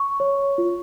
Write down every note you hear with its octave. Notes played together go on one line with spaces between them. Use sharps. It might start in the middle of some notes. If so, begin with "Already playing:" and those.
Already playing: C#6
C#5
F4